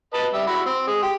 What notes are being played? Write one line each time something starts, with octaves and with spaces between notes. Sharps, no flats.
B4 D#5 A5
G3 E5
F#4 B5 E6
C4
G#3
G4